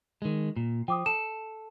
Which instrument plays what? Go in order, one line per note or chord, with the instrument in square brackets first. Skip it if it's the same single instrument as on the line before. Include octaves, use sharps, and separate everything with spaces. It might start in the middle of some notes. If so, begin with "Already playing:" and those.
[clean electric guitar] D#3 G#3
A#2
[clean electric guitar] F3 [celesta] G5 D6 D#6
[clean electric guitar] A4 [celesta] E7